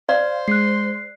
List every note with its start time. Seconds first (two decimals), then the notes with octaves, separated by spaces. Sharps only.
0.09 C5 D5 F5
0.48 G#3 F#6 C7